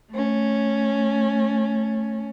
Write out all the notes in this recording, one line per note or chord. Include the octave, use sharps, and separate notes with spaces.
A3 C#4